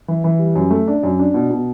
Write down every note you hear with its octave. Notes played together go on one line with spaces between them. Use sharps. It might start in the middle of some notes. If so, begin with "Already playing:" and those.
E3
E3
G3
F#2
A3
D4
F#2
D4
B2
B2